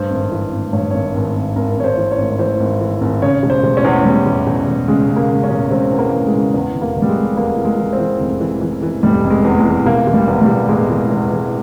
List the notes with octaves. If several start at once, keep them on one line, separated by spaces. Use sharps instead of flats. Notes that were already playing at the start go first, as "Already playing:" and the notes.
Already playing: G2 C5
G#1
E3
G#1
G2 C#5
G#1 C#5
G#1
G#1
G#1 A#4
G#1 C#5
C5
E3
C#5
G#1
E3 C5
G#1
E3
G#1
C#3 C#5
E1
C5
E1
C#4
E2
E2 G3
E1
E1
E1
C#3 G#3
C#3
A#3
C#3
C#4
E1
E1 C4
E2
A#3
E2
G#3
C#3
E2
F1
A#3
F1
G3
G#3
E2
E2 A#3
E3
G#3
E3
C4
E3
F1
E3
E3
E3
F1 G3
F1
G#3
E2
G#3
E3
E1 A#3
E1
G3
E2
G3
E1
E1 G#3
E3
E2
E3